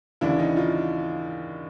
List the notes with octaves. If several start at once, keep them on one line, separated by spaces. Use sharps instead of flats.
D#2 C#3 E3 D4 E4
C#4 D#4
D#4 F4